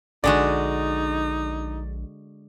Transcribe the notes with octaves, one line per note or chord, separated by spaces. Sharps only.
A#1 D3 G#3 D#4 F#4 D5